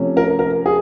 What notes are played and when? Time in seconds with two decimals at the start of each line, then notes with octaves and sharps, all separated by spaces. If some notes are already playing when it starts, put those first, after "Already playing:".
Already playing: C3 F3 A3 C#4
0.17 A#4
0.39 A#4
0.66 G#4